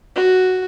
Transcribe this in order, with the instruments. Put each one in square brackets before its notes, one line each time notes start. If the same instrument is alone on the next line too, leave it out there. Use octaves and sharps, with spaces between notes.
[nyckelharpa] F#4